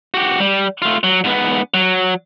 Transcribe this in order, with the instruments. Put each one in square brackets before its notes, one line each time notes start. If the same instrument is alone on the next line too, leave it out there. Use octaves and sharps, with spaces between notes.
[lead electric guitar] F#4 G4
G3
A3 F4
F#3
G#2 B3
F#3